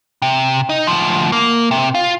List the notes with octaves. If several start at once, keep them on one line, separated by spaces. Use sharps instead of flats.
C3
D#4
D2 F3
A#3
C3
F4